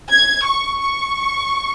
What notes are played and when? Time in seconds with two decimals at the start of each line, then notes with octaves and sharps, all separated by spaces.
0.10 G#6
0.45 C#6
0.80 C#6